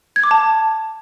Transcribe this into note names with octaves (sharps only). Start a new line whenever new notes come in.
G#6
D6
A5